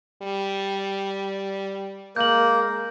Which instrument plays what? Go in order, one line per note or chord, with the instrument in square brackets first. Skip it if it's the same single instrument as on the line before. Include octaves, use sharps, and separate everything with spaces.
[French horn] G3
[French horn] G#3 [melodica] A#3 [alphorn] A#4 [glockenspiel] G6 F#7